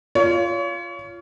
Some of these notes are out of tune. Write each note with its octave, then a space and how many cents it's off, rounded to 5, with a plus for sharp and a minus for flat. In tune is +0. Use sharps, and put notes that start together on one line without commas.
F4 -10 C#5 +30